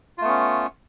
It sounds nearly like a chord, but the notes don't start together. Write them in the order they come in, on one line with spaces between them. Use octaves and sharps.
F4 A3 B3 C#4